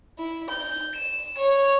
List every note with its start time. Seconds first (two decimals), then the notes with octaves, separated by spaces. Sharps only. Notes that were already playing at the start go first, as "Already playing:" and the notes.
0.19 E4
0.49 G6
0.96 E7
1.37 C#5